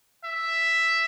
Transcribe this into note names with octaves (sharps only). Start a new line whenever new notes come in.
E5